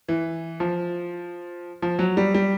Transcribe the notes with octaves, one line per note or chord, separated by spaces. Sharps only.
E3
F3
F3
F#3
G3
G3